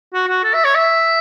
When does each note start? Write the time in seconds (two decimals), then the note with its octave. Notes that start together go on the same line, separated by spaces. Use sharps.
0.14 F#4
0.28 F#4
0.44 A4
0.54 E5
0.65 C#5
0.75 E5